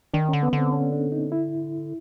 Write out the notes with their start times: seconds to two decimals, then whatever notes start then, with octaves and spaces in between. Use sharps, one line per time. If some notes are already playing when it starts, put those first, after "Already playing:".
0.14 D#3 D4
0.29 C#4
0.33 D3
0.43 B3
0.53 D3
0.58 C4
0.72 C#4
0.92 D4
1.12 D#4
1.32 E4